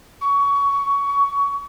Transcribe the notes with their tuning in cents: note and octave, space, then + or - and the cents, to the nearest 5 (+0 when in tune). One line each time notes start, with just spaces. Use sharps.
C#6 +20